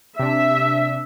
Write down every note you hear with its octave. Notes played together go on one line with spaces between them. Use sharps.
C3 D4 E5